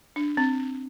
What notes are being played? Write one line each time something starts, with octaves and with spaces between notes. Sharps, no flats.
D4
C4